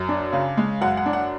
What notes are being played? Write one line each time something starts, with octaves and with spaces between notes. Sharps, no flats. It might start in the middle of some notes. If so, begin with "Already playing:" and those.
Already playing: F#2
D4
C#3
G#3
F#2 F#5
F#5
D4
F#5